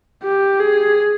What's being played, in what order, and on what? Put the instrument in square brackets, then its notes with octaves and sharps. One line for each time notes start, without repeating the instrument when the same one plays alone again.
[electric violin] G4
G#4